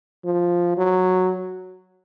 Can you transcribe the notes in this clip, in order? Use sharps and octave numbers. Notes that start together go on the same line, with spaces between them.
F3
F#3